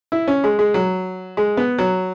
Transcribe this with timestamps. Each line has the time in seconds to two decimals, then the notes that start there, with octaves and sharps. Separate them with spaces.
0.12 E4
0.28 C#4
0.44 G#3
0.59 G#3
0.74 F#3
1.37 G#3
1.57 B3
1.78 F#3